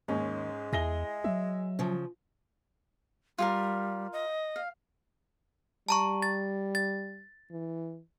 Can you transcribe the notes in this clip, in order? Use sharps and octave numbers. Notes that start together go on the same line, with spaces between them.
D#2 G#2 G#3 C#4
E2 E4 G#4 A#6 G7
F#3 E5
C#3 F3
G3 F4 G#4 A#4
D#5
F5
G3 A5 A#5 C#6
A6
A6
E3